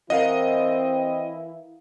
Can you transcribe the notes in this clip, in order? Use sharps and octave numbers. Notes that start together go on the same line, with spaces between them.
E3 C4 E4 A#4 D#5 F5 F#5